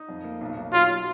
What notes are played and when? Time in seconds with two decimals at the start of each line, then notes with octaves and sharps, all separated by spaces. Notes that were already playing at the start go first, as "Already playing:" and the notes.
Already playing: D#4
0.09 F2
0.24 A#3
0.41 B1
0.57 B1
0.73 F#3 F4
0.90 F#3